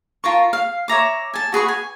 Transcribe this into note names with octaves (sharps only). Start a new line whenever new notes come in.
F4 A#4 A5 C#6
F5
C#5 E5 A#5 D6
G#5 A5
F#4 G#4 B4 C#6
G#5